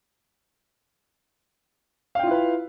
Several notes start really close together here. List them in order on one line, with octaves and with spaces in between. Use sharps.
F5 G5 F4 E4 B4